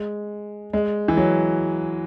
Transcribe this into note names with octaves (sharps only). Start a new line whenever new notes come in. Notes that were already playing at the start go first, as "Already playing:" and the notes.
Already playing: G#3
G#3
E3
F#3